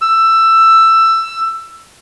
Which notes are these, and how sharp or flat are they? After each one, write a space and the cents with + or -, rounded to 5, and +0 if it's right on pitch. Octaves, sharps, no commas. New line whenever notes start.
E6 +15